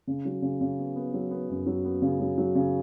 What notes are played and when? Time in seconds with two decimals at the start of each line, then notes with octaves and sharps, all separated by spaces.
0.07 C#3
0.25 F#3
0.42 C#3
0.61 C#3
0.78 B3
0.96 B3
1.14 F#3
1.31 B3
1.49 F#2
1.66 F#3
1.85 B3
2.02 C#3
2.20 F#3
2.38 F#3
2.55 C#3